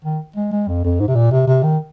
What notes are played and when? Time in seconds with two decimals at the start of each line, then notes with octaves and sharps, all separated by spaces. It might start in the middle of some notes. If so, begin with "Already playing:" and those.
0.04 D#3
0.36 G#3
0.52 G#3
0.68 F2
0.84 F2
1.00 G#2
1.08 C3
1.15 A#2
1.31 C3
1.47 C3
1.63 D#3